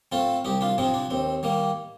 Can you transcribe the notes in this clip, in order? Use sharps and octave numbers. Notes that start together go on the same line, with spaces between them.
A3 C4 F4 A4
C2 D#4 G4
D4 F4
C3 F3 C4 D#4
D4
D#2 C4
D#3 G3 A#3